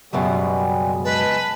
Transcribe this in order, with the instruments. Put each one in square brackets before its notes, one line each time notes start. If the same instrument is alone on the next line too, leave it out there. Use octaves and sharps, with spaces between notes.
[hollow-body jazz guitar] C#2 F#2 B2 [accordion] G3 G#3 B3
[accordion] G#3 A5 [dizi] B4